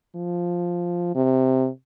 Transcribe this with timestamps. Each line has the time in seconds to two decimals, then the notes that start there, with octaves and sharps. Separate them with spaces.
0.16 F3
1.15 C3